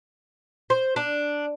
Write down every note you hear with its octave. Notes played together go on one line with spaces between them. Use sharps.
C5
D4